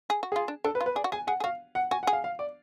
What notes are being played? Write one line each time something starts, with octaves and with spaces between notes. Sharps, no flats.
G#4
F#4
F4 G#4
D4
D4 A4
B4
F4
B4
G#4 D5
F#4
G#4 G#5
G#4 F#5
G#4
F#4 F5
F#5
F#4 G#5
F#5
G#4
F5
F5
D5